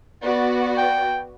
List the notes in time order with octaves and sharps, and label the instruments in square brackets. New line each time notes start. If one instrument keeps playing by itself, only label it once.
[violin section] B3 F#4 D5
[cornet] G5